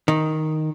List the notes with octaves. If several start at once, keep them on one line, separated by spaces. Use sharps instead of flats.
D#3